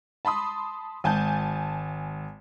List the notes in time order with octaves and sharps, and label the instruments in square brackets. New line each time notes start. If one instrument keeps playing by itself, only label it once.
[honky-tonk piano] A5 B5 C6 D#6
G#1 G#5 A5 G6